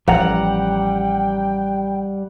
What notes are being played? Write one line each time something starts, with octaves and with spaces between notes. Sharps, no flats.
A1 F3 G3 F#5 G5 A#5